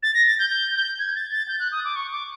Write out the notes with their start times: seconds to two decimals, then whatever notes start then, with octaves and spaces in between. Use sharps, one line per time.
0.03 A6
0.14 A#6
0.26 A6
0.39 G6
0.50 G6
0.74 G6
0.99 G#6
1.15 A6
1.32 A6
1.48 G6
1.60 F#6
1.72 D#6
1.85 D6
1.96 C#6
2.12 D6